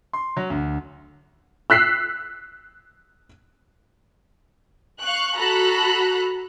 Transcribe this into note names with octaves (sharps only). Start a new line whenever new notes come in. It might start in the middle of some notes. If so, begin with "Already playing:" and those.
C6
F#3
D2
E6 F#6 B6 C7
F5 C#6 F#6
F#4 A4 A#5 B5 F#6